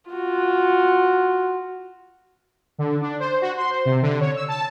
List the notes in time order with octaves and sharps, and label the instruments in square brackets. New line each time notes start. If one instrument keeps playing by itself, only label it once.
[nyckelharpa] F4 F#4
[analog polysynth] D3
D4
C5
F#4
C6
C5
C3
D3
C#5
E6
A5